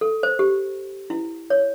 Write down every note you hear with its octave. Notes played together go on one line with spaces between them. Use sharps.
A4
C5
G4
E4
C#5